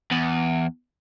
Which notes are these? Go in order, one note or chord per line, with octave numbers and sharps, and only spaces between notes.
E2